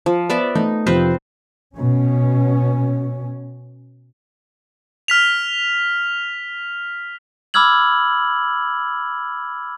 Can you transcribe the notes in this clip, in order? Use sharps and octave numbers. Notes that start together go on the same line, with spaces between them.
F3
B3 D5 E5
A3 D#4
F2 C3 F3 C4 B4 C5
B2 C#4
F6 B6 F7
B5 D6 E6 F6 G#6 F#7